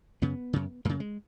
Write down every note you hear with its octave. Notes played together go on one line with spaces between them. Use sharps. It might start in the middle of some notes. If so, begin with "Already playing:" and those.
F#2 C#3 B3
F#2 C#3
F#2 C#3 A#3
G#3